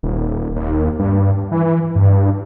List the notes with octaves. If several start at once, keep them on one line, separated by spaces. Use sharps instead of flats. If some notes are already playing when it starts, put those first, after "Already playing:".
D#1
D#2
G2
E3
G2